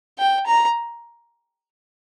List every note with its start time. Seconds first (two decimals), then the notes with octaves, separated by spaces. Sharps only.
0.18 G5
0.46 A#5